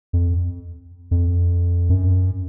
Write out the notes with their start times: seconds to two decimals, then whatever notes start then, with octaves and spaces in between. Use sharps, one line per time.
0.13 F2
1.11 F2
1.90 F#2